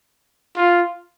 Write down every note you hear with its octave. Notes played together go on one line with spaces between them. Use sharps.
F4